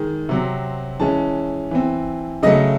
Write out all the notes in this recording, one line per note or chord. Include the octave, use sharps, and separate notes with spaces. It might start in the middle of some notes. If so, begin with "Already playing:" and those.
Already playing: D#3 G#3
C3 F#3 C4
E3 G#3 C#4 A5
E3 C4
C#3 F#3 A3 D#5